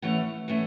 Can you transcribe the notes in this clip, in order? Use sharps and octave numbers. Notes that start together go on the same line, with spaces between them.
E3 A3 C#4 F#5
E3 A3 C#4 F#5